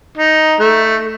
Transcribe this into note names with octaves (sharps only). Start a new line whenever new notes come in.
D#4
A3